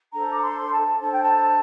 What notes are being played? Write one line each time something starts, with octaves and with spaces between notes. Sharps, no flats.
D4 A4 C5 A#5
D6
C6
A5
D4 A4 C5 A5
G5
A5